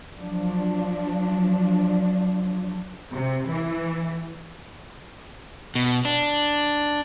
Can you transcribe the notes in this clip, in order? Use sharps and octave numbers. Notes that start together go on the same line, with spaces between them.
F3 F#3 D4
C3
E3
B2
D4